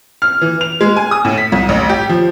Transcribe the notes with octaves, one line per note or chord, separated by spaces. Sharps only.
F6
E3
F7
G#3
G#5
D#6
A2
B6
C2
A1
G4
F3